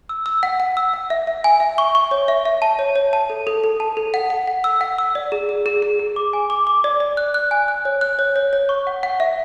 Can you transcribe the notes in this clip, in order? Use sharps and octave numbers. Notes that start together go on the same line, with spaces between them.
E6
E6
F#5
F#5
E6
F#5
E5
E5
G#5
E5
C#6
C#6
C#5
E5
E5
A5
C#5
C#5
A5
A4
A4
A4
A5
A4
F#5
F#5
F#5
E6
F#5
E6
D5
G#4
G#4
G#4
G#4
G#4
D6
G#5
D6
D6
D5
D5
F#6
F#6
G#5
F#6
C#5
F#6
C#5
C#5
C#5
C#6
F#5
F#5
E5